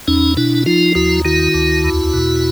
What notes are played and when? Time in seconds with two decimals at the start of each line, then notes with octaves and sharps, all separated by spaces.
0.08 E2 C#4 D#4
0.37 B2 D4 E4
0.66 F3 D#4 F4
0.95 D#2 E4 F#4
1.25 D#3 E4 F#4
1.54 D2
1.84 E2
2.13 B2